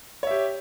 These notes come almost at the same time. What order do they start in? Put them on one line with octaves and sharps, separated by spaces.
C#5 E5 G4